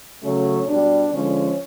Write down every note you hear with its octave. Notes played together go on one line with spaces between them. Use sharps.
C#3 F#3 A3 C#4
B2 G3 D4
D3 F3 G#3 C#4